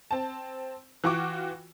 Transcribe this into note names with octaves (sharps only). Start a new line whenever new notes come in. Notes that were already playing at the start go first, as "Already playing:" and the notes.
C4 A5
E3 F4 F#4 G5 C#6 D6